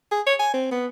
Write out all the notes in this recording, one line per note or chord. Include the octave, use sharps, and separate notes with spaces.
G#4
C#5
G#5
C4
B3